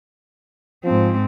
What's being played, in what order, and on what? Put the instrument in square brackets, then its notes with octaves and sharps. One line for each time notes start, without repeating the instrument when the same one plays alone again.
[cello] G#2 C4 [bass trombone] F3